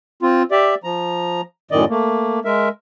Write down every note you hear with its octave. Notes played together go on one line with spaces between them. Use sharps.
C4 F4
G4 D5 E5
F3 A#5
F#2 A2 D#3 D5 D#5
A3 A#3
G#3 A#4 E5